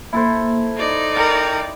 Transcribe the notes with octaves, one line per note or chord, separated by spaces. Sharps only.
A#3 E4 A4 C5
D#4 D5 B5
A#4 G5